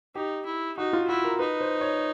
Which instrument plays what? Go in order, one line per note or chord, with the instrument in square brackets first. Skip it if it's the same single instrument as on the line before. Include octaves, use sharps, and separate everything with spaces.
[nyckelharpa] D#4 [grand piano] G4
[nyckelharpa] E4
[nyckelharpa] D#4 [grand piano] F#4
[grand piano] F4
[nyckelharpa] E4 [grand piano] F#4
[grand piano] A#4
[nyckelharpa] D#4 [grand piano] B4
[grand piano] C5
C#5